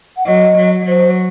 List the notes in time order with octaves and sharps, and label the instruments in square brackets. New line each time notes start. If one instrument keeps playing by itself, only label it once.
[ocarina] F#5
[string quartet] F#3 [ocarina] D#5
[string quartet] F#3
[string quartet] F#3 [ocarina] C5